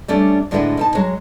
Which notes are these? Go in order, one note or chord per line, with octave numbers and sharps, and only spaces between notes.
G3 A3 C#4 D4
A2 D3 G#3 B3 E4 E5
B2 D#4 A5
F#3 G#3